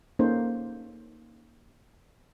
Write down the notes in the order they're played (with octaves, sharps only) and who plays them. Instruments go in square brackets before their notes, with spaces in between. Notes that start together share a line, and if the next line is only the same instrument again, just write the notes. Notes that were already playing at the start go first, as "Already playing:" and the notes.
[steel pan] A#3 C#4 D#4 G#4 A4 C5